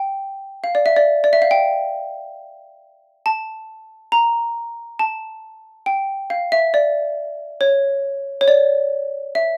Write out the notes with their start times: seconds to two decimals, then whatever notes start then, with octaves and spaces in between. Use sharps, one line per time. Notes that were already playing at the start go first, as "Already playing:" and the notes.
Already playing: G5
0.64 F5
0.75 D5
0.86 E5
0.96 D5
1.24 D5
1.33 E5
1.42 F5
1.51 G5
3.26 A5
4.12 A#5
4.99 A5
5.86 G5
6.30 F5
6.52 E5
6.74 D5
7.61 C#5
8.41 C#5
8.48 D5
9.35 E5